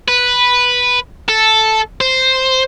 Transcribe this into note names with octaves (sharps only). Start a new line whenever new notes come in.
B4
A4
C5